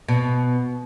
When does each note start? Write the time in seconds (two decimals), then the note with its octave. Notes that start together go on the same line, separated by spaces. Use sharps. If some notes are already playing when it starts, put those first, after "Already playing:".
0.08 B2